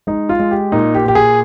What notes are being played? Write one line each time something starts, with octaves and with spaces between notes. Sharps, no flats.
G#3 D#4
F4
G#3
G4
A#2 D#4
G4
A#2 G4
G#4